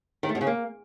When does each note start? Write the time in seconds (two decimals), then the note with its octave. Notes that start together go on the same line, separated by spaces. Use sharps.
0.23 D#3
0.29 A3
0.35 B2
0.41 C#3
0.47 A#3